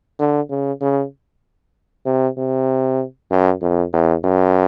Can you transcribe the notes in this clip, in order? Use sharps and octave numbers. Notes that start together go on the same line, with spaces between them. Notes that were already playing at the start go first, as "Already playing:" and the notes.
D3
C#3
C#3
C3
C3
F#2
F2
E2
F#2